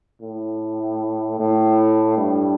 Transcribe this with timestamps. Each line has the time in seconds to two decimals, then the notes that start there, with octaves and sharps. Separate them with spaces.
0.21 A2
1.39 A2
2.17 G2